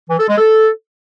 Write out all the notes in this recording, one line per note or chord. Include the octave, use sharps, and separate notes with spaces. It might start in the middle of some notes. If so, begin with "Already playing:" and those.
E3
A4
G#3
A4